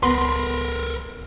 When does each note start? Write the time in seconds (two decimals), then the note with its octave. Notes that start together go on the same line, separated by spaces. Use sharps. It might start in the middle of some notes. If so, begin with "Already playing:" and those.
0.03 C#2 B3 A#4 B4 C6